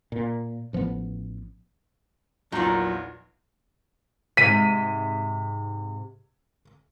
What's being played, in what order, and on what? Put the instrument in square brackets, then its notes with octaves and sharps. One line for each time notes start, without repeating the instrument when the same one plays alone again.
[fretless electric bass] A#2
A1 F3 F#3 B3
[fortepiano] A#1 E2 [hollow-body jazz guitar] F#3 F4 [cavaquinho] D#4 A#4 F#5
[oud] G#2 C3 [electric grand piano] B6 D#7